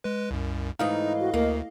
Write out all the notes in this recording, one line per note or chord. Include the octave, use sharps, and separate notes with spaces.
G#3 B4
C2 F#2
G#2 E3 A3 D#4 D#5 F5
F#4
D2 A#3 A#4